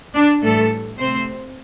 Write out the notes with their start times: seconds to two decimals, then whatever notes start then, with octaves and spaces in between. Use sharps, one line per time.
0.15 D4
0.43 A2 E3 G3 A3 A4
0.99 C3 A3 C4 C5